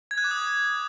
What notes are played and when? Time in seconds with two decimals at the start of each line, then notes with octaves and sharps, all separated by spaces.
0.11 G#6
0.18 F#6
0.24 D6
0.31 D#6